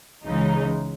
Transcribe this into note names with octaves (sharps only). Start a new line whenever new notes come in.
C#2 C#3 E3 G#3 D#4